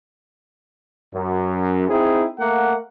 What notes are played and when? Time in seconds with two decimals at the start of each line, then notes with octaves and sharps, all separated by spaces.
1.14 F#2
1.89 C4 D#4 E4 G#4
2.39 A3 A#3 F#5